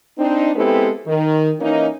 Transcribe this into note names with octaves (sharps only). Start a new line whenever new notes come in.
C4 D4 D#4
G#3 B3 C4 E4 G4 A4
D#3
E3 A#3 C#4 D#4